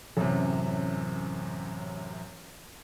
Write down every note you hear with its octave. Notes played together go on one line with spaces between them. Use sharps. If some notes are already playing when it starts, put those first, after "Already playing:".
A1 F#2 C3